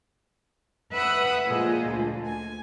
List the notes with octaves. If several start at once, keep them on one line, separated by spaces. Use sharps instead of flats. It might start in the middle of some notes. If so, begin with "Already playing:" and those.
B4 E5 F#5 B5 D#6
A#2 F3 G#3 A#3
D2
G#5